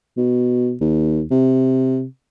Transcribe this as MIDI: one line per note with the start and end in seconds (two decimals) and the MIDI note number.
0.17 0.75 47
0.81 1.23 39
1.31 2.05 48